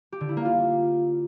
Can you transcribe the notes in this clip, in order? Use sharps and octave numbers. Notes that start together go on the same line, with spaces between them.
G4
D3
E4
A#3
F4